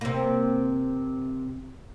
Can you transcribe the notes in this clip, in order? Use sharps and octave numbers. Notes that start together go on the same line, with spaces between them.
C3 A#3